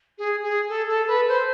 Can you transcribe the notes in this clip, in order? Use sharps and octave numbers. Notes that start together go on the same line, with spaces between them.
G#4
G#4
A4
A4
B4
C5